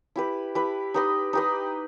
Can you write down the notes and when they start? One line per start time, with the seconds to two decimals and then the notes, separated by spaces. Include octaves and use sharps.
0.16 E4 G4 B4
0.55 E4 G4 B4
0.94 D#4 G4 B4 D#5
1.33 D#4 G4 B4 D#5